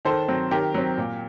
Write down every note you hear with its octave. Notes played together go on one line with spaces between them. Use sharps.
D#3 A4 C5
F#3 C4
D#3 G4 A#4
F#3 C4
A#2